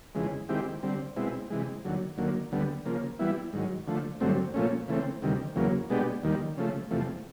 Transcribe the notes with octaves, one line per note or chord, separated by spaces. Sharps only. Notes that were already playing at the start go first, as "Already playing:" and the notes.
F2 C#3 E3 G#3
D#3 G#3 C4 E4 G4
D3 G3 C4
B2 G#3 C4 E4
C3 E3 G#3
D#2 D3 F#3
D#2 D3 F#3 A#3
D2 D3 G3 B3
C#3 F3 A#3
E3 G3 B3 E4
G#2 D#3 F#3
D3 F3 A3
G2 D3 F#3 A3 C4
A#2 F3 A3 C#4
C#3 E3 A3 C4
D2 C3 D#3 G3
E2 C#3 F#3 A#3
B2 G#3 B3 D4 G4
D#2 D#3 G3
C#3 F3 A3
E2 C3 F3 A3